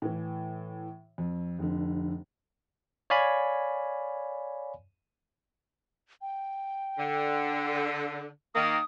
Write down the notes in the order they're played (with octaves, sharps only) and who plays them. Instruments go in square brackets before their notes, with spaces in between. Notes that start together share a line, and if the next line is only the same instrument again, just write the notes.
[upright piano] A2 E3
F2
F1 F2 D3
[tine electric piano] C#5 D5 F5 G#5 B5
[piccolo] G5
[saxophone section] D3
[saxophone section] D#3 A#3 [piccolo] D#6